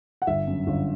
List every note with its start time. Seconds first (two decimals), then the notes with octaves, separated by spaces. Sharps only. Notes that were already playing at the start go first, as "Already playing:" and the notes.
0.22 F#5
0.27 G1 E5
0.47 F#2
0.67 G1